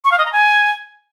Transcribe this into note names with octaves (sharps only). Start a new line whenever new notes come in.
C#6
F5
D#5
A#5
G#5